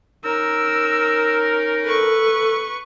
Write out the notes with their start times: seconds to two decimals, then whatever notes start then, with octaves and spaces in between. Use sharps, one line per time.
0.25 C#4 D#4 A#4 E6
1.85 A4 B4 C#6